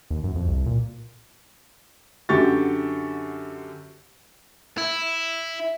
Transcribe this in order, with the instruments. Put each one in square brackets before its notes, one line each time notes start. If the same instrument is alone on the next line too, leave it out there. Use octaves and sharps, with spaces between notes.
[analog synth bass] D#2
F#2
F2
C2
A#2
[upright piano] F#2 D3 F#4 G4 C#6 A6
[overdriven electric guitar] E4